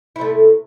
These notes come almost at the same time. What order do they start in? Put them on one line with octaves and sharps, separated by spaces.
E4 C3 A3